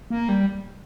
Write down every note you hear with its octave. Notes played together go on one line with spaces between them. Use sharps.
A#3
G3